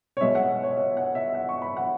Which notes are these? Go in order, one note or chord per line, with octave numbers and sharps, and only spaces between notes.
C#5
B2 G#3 B3 E5
F#5
C#5
E5
F#5
E5
F#5
C#6
B5
F#5